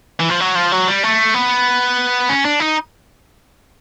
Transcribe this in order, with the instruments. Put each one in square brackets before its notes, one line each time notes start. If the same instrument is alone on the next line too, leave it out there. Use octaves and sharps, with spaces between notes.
[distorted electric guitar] E3
F3
F#3
F3
F#3
G3
A3
B3
C#4
D4
D#4